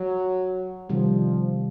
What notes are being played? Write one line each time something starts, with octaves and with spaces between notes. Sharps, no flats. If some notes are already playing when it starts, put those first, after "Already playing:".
Already playing: F#3
C3 D#3 F3 G3